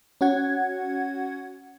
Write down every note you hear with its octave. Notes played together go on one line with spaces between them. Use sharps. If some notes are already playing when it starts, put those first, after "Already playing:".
C#4 F#4 F#5 G#6